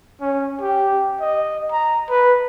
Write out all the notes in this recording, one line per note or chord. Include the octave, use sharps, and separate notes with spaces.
C#4
G4
D#5
A#5
B4